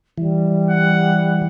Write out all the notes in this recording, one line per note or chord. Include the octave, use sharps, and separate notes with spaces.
E3 G3
F#5